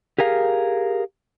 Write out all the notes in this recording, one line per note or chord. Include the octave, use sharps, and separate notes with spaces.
G4 G#4 A#4 F5